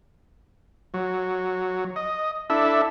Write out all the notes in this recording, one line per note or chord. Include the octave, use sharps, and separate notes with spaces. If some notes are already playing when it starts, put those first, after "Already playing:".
F#3
D#5
D4 E4 A4 E5